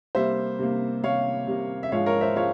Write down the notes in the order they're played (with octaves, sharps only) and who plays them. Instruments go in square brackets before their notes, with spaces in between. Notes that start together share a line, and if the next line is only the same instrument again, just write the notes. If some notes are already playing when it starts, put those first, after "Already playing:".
[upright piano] C3 G3 A#3 C5 E5
C3 G3 A#3
C3 G3 A#3 C#5 F5
C3 G3 A#3
E5
G#2 F3 G#3 C#5 F5
A#4 C#5
C5 E5
F3 G#3 C#5 F5